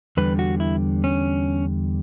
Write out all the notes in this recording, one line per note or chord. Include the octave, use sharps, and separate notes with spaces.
E2 D3 G3 B4
F#4
E4
C#4